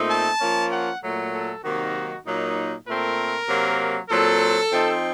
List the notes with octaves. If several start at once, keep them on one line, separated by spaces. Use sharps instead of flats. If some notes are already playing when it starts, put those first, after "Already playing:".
Already playing: A#2 A3 C4 D#4
A5
F3 A#3 C#4
F#5
A#2 F#3 A3
A4
C3 D#3 F#3 A#3 D#4 F#4
A#2 F#3 A#3 D#4
A#2 A3 C4 A#4
C3 F#3 A#3
A#2 F#3 C4 A4
F3 C4 D#4